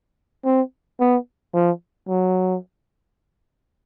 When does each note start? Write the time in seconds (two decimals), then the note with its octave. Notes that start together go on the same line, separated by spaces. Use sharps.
0.45 C4
1.00 B3
1.54 F3
2.08 F#3